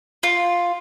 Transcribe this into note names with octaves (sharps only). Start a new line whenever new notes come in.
F4